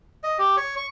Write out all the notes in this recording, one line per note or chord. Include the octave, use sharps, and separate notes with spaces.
D#5
G4
C#5
C#6